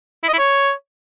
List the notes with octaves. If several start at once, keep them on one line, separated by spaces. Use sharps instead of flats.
E4
D#5
E4
C#5